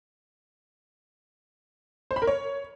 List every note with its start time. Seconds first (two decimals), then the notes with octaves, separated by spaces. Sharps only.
2.11 C5
2.16 B5
2.22 A#4
2.27 C#5